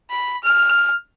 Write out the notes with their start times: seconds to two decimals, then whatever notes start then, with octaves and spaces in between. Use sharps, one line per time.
0.11 B5
0.44 F6